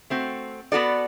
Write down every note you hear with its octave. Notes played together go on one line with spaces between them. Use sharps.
A3 C4 F#4
B3 F#4 A4 D5